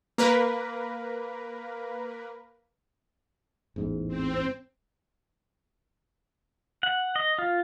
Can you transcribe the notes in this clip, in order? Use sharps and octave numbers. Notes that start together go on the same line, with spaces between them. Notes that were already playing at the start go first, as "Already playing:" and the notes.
A#3 A#4 B4
A1 E2 G#2
C4
F#5
D#5
F4